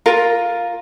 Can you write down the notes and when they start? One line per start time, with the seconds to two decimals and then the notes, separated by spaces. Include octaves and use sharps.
0.06 F4 A#4